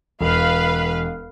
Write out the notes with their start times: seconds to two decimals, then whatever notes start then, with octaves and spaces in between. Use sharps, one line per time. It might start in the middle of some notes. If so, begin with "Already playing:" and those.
0.21 E1 B4 F5